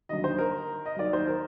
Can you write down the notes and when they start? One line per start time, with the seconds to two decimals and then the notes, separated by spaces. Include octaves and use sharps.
0.09 D#2 D3 F#3 D#5
0.24 C5
0.39 A#4
0.86 D#5
0.96 D#2 D#3 F#3 D5
1.13 C5
1.27 A#4